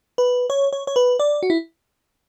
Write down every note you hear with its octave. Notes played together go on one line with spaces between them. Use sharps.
B4
C#5
C#5
C#5
B4
D5
F#4
E4